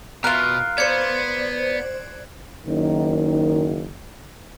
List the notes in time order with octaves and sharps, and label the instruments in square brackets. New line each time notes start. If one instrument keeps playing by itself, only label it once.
[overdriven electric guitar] B2 [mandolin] F4 A#4 [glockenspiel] F#6
[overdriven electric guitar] B3 [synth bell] C5 D5 [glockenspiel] G#6 C#7
[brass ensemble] F#1 D#3